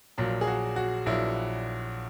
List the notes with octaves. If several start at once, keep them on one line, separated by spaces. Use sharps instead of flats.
A#1 A#2 F#3
G#4
F#4
F#4
A#1 A#2 F#3 E4